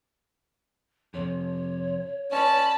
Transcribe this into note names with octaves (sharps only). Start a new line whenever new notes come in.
F2 C3 C#5
C#4 D5 A5 B5